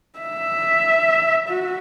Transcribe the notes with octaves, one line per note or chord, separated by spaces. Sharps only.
E5
F#4